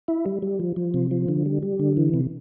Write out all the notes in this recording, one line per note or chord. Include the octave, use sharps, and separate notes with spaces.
E4
G3
G3
F3
F3
C3
F3
D3
G3
G3
D3
E3
C3